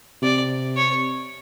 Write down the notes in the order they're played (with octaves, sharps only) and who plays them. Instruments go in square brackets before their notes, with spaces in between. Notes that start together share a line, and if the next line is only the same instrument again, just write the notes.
[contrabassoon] C3 [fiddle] D5
[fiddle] C#5